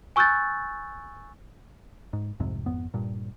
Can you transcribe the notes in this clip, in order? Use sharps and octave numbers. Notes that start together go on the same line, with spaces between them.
G#5 C#6 E6 F#6 G6 A6
G#2
C2 F2 G#2 C3
G#1 F2 B3
G2 A#2